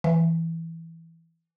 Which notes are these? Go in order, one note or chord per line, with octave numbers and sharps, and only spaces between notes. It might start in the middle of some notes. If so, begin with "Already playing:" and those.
E3